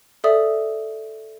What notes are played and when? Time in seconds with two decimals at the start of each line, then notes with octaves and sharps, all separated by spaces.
0.24 A4 D5 E5 D#6